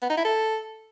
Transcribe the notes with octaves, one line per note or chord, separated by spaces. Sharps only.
B3
D#4
E4
A4